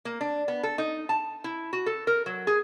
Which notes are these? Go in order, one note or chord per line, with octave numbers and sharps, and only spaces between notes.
A#3
D4
B3
A4
D#4
A5
E4
F#4
A4
A#4
F#3
G#4